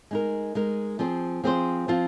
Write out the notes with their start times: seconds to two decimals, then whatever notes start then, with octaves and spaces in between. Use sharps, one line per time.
0.11 G#3 D#4 A#4
0.55 G#3 D#4 A#4
0.99 F3 C4 G#4 C5
1.44 F3 C4 G#4 C5
1.88 F3 C4 F4